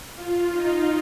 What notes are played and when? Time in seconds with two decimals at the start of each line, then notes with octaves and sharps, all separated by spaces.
0.16 F4
0.52 D#4